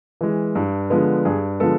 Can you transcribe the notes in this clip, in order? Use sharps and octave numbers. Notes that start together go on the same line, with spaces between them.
E3 G#3
G2
D3 F3 G#3 B3
G2 G#4
D3 F3 G#3 B3 A4